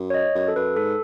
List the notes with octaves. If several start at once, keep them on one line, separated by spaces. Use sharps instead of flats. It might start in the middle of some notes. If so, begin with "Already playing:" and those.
Already playing: F#2
C#5
D#5
F#2
A4
F#2 B4
G#2 A4